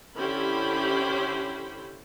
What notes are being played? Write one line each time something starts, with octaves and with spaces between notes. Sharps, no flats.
D3 C#4 E4 G4 C5 B5